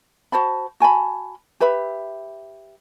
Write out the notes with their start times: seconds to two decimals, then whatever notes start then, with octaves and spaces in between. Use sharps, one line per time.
0.32 F#4 C5 A5 B5
0.80 F#4 G#5 A5 B5
1.60 G4 B4 E5 B5